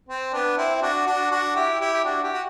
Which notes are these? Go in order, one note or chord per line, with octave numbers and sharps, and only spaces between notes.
C4
B3 D4
C4 E4
E4
D4 F#4
D4 F#4
D4 F#4
E4 G4
E4 G4
G4
D4 F#4
E4 G4
F#4